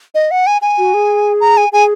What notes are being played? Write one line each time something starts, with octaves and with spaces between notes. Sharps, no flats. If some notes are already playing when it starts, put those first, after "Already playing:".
D#5
F#5
G#5
G#5
F#4
G#4
A#5
G#5
G#4 G#5